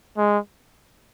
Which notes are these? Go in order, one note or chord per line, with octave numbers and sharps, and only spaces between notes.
G#3